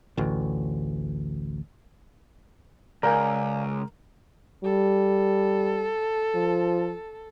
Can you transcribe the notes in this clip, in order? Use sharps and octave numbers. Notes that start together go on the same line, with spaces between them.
A1 D2
C#2 A#4 D5 F5 G#5
G3 A4
F3